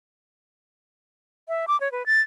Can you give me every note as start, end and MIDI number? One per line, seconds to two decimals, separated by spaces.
1.48 1.66 76
1.68 1.79 86
1.80 1.91 73
1.92 2.06 71
2.06 2.21 93